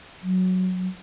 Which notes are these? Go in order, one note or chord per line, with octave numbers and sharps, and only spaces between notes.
F#3